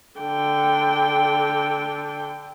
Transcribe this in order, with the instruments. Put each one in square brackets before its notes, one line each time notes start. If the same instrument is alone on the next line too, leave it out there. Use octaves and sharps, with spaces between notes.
[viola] D3 G5